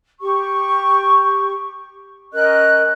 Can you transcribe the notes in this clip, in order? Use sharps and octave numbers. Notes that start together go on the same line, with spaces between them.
G4 C#6
C#4 A#4 D#5 F#6